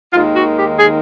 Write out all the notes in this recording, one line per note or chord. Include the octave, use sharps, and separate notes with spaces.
D#2 D#3 G#3 F4
F#4
G4
G#4